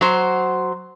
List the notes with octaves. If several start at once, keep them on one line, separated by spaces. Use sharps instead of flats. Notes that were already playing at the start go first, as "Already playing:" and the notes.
F#3 C5